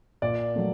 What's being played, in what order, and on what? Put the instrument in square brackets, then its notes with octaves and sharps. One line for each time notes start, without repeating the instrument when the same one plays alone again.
[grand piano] A#2 D5
F#3 A3